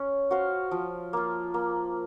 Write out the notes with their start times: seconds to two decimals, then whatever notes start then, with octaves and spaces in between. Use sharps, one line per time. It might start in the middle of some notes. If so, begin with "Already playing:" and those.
Already playing: C#4
0.31 F#4 C5 F5
0.71 F3
1.13 A#3 F4
1.54 A#3